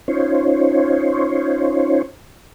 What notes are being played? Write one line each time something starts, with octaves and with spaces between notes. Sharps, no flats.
C#4 D#4 F4 C5 C#5